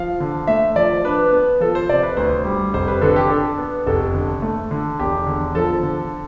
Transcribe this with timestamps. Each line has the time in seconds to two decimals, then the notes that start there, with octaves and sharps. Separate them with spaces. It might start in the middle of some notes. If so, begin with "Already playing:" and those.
Already playing: F3 F5
0.20 D3
0.47 A3 E5
0.76 F3 D5
1.05 D4 B4
1.32 B3
1.60 F3 A4
1.75 C5
1.89 C3 D5
2.03 B4
2.17 D2 C5
2.45 G3
2.73 F1 C5
2.88 B4
3.01 D3 A4
3.16 G4
3.30 D4 A4
3.58 B3
3.87 F1 A4
4.14 D3
4.42 A3
4.71 D3
4.99 E1 G4
5.27 D3
5.55 F3 A4
5.83 D3